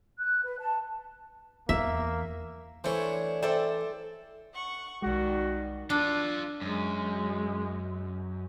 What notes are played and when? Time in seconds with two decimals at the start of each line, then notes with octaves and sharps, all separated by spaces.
0.19 F#6
0.43 B4
0.60 A5
1.69 E2 A#3 E5
2.84 E3 A3 D4 C5 C#5
3.43 A4 C5 D5 E5 G5
4.52 F#5 C#6
5.02 B1 D#3 G3 G#3 F#4
5.90 D4 F4 A4
6.61 F#2 G#3